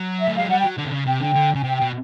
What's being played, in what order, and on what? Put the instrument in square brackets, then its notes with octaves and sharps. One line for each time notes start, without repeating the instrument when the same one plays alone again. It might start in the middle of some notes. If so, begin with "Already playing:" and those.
Already playing: [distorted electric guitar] F#3
[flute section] E5
[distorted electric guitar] A3
[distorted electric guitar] G#3 [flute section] F5
[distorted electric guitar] G3 [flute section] F#5
[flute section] G5
[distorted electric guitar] F#3
D3
C3
C#3
[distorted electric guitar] C3 [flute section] G5
[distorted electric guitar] D3 [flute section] G5
[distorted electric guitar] D3
[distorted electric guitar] C#3 [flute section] G#5
[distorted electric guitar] C3 [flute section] G5
[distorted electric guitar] B2 [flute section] G5